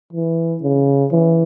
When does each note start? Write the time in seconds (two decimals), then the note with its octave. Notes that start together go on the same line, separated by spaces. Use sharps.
0.13 E3
0.62 C#3
1.12 E3